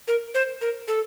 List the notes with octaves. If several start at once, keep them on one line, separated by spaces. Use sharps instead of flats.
A#4
C5
A#4
A4